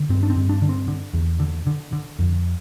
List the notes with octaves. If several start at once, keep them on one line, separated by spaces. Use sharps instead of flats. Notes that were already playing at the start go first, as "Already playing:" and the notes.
Already playing: D3
G2 C4
D4
C4
G2
D4
D3
C4
D3
E2
D3
D3
D3
F2